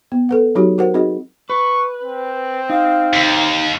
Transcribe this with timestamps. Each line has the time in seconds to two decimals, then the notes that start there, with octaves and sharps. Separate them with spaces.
0.12 B3
0.29 A4 B4 F#5
0.55 F#3 D#4 F#4 G4
0.78 F#4 A#4 C5 F#5
0.94 C4 D#4 F#4 G#4 D#5
1.50 B4 C#6
2.03 C4
2.70 D#4 F5
3.13 D#2